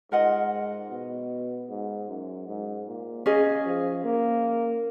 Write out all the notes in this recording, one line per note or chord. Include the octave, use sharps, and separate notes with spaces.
G#2 F4 A#4 D#5 F#5
B2
G#2
F#2
G#2
A#2
C#3 C#4 G#4 D#5
F3
A#3